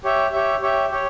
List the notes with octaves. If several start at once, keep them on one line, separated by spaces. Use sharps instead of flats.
G4 C#5 E5
G4 C#5 E5
G4 C#5 E5
G4 C#5